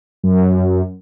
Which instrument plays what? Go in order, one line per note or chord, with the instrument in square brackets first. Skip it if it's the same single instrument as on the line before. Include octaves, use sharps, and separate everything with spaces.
[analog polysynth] F#2